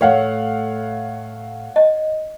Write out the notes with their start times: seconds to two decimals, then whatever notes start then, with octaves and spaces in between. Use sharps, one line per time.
0.01 A2 A3 C#5 F5 F#5
1.76 D#5